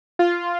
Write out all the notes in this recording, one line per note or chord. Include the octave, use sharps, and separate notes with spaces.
F4